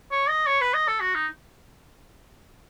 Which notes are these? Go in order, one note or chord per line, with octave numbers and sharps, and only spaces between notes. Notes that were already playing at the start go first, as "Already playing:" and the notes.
C#5
D#5
C#5
B4
D#5
A4
F#4
D#4